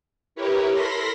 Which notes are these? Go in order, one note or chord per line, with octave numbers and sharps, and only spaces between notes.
E4 G4 A#4 B4 C#5
A4 A#4 B5 C6 A#6 B6